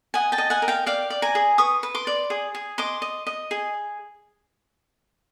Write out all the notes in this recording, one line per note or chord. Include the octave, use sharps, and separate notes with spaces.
D#5 F#5 G#5
G5 A5
D#5
F#5 G#5
A#4
F5 G5
D5 F5 G5
D5
G#5 A#5
G#4
B4 C#6 D#6
B4
C6 D6
D5
G#4
G#4
D#5 C6 D6
D#5
D#5
G#4